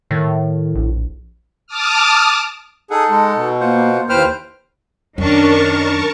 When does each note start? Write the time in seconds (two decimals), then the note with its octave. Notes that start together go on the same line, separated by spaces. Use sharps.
0.11 A2 D#3
0.75 A#1
1.67 A5 D6 D#6 F6
2.90 D#4 G#4 A4 F#5 A5
3.09 G#3
3.36 B2
3.60 A#3 F4 C5 F#5
4.09 D#2 E4 B4 C5 G5 F6
5.18 F#2 D#3 C#4 D4 A#4 A5 C#6